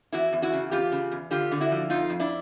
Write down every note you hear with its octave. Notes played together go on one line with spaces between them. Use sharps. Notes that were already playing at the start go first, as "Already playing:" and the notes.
E2 E4 F#4
E2
E4 F#4
C#3
E2 F4 G4
C#3
E2
D3 F4 G4
D3
E4 F#4
F3
F2 D#4 F4
F2
D4 E4